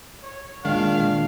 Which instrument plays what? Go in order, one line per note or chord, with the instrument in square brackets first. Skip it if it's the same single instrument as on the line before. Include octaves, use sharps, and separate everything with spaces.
[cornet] C#5
[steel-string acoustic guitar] A#2 D4 [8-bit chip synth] D#3 [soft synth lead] G#3 [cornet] F5